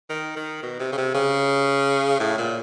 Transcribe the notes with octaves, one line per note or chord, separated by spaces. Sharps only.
D#3
D#3
B2
C3
C#3
C3
C#3
A2
A#2